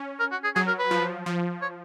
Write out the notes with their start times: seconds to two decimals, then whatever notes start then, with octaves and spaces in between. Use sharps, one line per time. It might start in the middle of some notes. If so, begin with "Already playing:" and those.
Already playing: C#4
0.20 A#4
0.32 F#4
0.44 G#4
0.56 F#3 G#4
0.67 A#4
0.79 B4
0.91 F3
1.26 F3
1.62 C#5